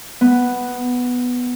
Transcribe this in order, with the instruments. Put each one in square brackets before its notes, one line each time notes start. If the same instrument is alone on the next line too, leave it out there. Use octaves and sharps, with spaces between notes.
[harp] B3